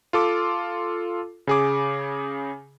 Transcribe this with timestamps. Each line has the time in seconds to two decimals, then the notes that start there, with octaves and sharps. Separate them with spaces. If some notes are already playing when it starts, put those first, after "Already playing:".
0.13 F4 A4 D6
1.47 C#3 G#4 D6